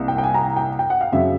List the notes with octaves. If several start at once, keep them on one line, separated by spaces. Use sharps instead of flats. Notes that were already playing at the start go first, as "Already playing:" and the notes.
Already playing: C2 A#3
G5
G5
G#5
A#5
G5
G5
F#5
F5
F#2 C#3 F#3 E5